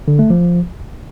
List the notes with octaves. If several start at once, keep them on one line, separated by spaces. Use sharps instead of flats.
D3
A3
F3